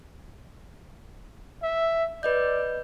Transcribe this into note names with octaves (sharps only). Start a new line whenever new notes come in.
E5
B4 D5 D#5 G6